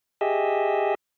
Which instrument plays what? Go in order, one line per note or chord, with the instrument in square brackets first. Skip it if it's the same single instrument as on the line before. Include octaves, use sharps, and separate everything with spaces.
[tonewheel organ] G4 G#4 D#5 E5